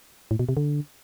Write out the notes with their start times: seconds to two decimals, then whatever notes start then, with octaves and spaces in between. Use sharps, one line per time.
0.31 A2
0.39 B2
0.49 C3
0.57 D3